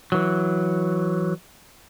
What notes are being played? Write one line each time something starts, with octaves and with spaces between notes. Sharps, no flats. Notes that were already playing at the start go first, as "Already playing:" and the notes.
E3 F#3